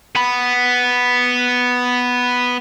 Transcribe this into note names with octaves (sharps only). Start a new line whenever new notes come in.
B3 B5